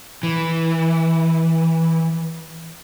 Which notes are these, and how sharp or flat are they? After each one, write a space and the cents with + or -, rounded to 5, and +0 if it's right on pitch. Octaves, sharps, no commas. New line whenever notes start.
E3 -10